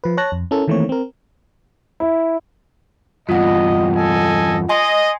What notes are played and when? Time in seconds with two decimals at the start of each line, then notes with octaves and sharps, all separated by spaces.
0.04 F3 B4
0.17 C#5 A5 F#6 A#6
0.32 F2
0.51 C#4 E4 A4 A#4
0.68 D#3 E3 A3 A#3 C4 C#5
0.89 C4 A#4
2.00 E4
3.29 E2 G2 F4 D#5 F#5
3.96 A4 D#5 G#5
4.69 D#5 G#5 C6